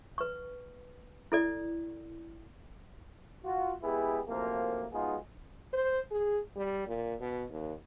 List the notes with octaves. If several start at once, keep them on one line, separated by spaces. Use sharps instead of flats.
B4 C#6
E4 A4 D5
F4 F#4
G#3 B3 E4 G4 G#4
F#2 A2 C3 F3 A#3
B1 G#3 B3 D#4 F4 G#4
C5
G#4
G3
A#2
B2
D#2